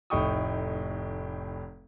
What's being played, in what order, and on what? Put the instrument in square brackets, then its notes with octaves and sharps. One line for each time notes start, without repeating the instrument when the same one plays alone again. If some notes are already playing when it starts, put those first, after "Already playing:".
[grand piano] F1 A2 D#4 G5 C#6 D#6